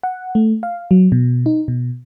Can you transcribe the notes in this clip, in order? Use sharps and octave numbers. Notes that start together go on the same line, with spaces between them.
F#5
A3
F5
F#3
B2
D#4
B2